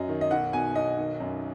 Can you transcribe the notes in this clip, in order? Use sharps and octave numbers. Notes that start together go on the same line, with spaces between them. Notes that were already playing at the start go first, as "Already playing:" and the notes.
Already playing: F#2 F#3 D#5
D#3
D#5
B1 F#5
B2 G#5
B1 D#5
D#3
F#2